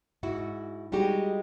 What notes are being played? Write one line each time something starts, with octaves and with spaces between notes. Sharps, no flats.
G#2 E4 F#4
G3 G#3 D#4 F#4 G4